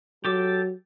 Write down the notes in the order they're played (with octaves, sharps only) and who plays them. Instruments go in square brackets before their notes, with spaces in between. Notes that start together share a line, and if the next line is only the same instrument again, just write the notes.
[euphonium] F#3 [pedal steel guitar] G4 A4 D6